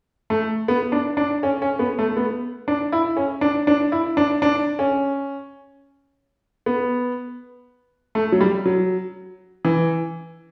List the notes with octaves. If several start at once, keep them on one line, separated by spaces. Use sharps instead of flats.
A3
B3
D4
D4
C#4
C#4
B3
A3
B3
D4
E4
C#4
D4
D4
E4
D4
D4
C#4
B3
A3
F#3
G3
F#3
E3